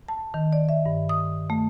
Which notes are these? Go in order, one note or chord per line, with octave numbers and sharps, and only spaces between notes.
A5
D#3
D5
E5
G2
D#6
A3